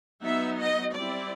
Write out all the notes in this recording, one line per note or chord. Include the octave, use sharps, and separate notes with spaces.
F#3 B3 D#4 E5
D#5
G3 C4 E4 D5